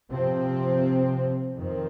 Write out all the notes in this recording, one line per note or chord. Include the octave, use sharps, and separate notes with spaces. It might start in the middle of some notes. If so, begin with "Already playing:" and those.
C3 F3 C4
F2 D#3 C4